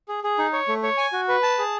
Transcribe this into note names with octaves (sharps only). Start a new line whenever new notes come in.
G#4
G#4
D#4
C#5
A3
C#5
G#5
F#4
B4
A5
G#4